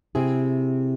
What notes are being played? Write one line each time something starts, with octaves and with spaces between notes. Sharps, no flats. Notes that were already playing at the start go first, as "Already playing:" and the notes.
C3 C4 E4 G#4